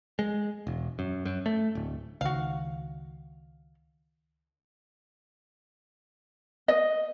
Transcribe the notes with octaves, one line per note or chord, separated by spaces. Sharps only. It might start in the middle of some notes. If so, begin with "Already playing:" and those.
G#3
E1
F#2
F#2
A3
D1
C#2 D#3 F#4 F5
D#5